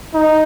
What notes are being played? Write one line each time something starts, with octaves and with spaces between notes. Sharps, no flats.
D#4